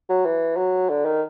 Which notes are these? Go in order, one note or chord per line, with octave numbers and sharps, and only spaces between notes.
F#3
E3
F#3
D3
D#3